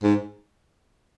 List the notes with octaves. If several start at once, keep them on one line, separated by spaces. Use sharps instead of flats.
G#2